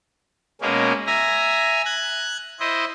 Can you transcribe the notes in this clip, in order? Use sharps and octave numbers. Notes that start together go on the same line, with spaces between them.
B2 G#3 A#3 C#4
E5 G#5 A#5
F#6 G#6
E4 C5 D#5